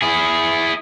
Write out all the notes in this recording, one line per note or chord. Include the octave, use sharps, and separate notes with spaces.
E4 G#4